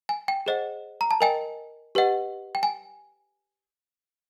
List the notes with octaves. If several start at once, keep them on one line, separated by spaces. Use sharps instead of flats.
G#5
G5
G#4 C5 D#5 F#5
A#5
A5
A#4 D#5 G5 G#5
G4 B4 D#5 F#5
G5
G#5